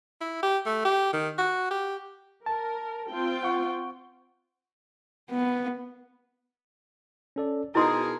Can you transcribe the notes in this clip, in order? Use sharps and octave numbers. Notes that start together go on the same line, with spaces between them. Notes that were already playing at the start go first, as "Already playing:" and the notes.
E4
G4
A3
G4
D#3
F#4
G4
A#4 A5
C4 F4 G5
F#5 C#6
B3
C#4 A4 D5
B2 D#4 E4 F#4 G#4 A#4 C6 D#6